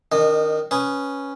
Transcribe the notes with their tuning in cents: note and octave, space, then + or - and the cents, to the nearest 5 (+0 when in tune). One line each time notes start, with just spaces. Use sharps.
D#3 -5 D4 -45 D#5 -25
C#4 +0 B4 +0 D#6 +0